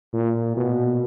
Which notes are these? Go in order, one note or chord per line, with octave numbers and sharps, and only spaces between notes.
A#2
B2